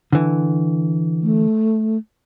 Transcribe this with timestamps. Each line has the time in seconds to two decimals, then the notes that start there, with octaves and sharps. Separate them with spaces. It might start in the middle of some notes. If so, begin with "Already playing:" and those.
0.13 D3 E3
1.23 A3